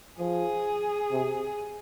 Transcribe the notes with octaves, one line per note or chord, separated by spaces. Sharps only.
F3 G#4
C3